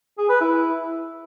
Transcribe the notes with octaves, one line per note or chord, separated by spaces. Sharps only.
G#4
B4
E4